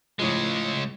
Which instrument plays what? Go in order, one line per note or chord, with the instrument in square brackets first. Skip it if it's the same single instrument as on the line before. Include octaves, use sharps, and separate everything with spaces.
[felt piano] A2 F3 [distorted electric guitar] C#3 G#3